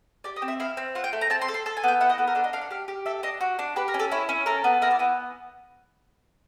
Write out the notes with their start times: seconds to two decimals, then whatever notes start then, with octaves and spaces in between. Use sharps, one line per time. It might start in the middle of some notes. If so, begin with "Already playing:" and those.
0.24 G4 D5
0.36 D#5
0.42 C4
0.48 E5
0.60 E4 F5
0.77 C4
0.95 F4 F#5
1.04 G5
1.13 A3
1.21 A#5
1.30 C4 A5
1.42 C6
1.48 A4
1.54 C6
1.66 A4 A5
1.77 G#5
1.83 B3 G5
2.00 E4 F#5
2.10 D#5
2.18 B3 A4
2.27 A#4
2.35 D4 A4
2.44 D#5
2.53 D4 F5
2.61 F#5
2.71 G4 F5
2.88 G4
3.06 A4 E5
3.23 D4 D#5
3.41 F#4
3.59 D4
3.76 G4 B4
3.88 A#4
3.94 C#4
4.00 A4
4.12 E4 C#5
4.29 C#4
4.46 A4 A#4
4.64 B3
4.82 E4 A#4
4.91 D5
4.99 B3 G#5